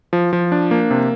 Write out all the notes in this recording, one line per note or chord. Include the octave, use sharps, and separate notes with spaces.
F3
F3
D4
A#3
C3